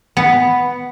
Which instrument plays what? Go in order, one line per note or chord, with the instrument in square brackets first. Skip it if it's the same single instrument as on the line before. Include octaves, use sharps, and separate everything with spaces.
[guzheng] B3